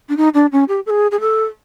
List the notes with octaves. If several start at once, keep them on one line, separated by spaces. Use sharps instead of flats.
D4
D#4
D4
C#4
G4
A4
G#4
G#4
A4